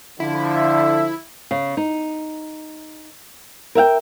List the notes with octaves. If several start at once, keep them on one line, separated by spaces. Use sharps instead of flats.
D3 F3 E4
E5
C#3
D#4
A#4 E5 F5 G5